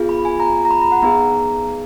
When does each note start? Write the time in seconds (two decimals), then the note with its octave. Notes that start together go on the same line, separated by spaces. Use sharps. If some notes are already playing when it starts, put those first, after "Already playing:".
Already playing: B3 F4 G#4
0.09 B5
0.25 G#5
0.40 A#5
0.65 A#5
0.71 B5
0.82 A#5
0.92 F#5
1.02 B3 D#4 G#4 A#5